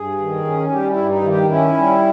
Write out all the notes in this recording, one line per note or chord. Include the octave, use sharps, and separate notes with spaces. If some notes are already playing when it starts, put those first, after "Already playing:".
Already playing: G2 G#4
D#3
C#4
G3 G4
E4
G2
D#4
D#3 E4
G4
C#4 E4
G3